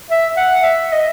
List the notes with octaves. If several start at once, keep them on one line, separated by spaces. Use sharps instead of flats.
E5
F#5
E5
D#5